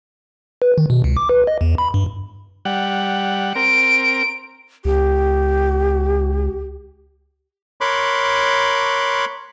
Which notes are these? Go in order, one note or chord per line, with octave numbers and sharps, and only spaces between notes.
B4
D#3
B2
C#2
D6
B4
D#5
E2
B5
G2
G3 F#5
C4 A#4 D7
C#2 G4
A#4 C#5 B5 C6 D6 F#6